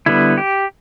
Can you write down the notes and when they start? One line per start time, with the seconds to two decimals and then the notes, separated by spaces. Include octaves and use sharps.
0.06 D3 G3 B3 E4
0.38 G4